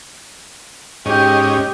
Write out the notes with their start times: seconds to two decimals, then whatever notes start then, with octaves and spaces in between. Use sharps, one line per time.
1.06 G#2 C#4 G4 D#5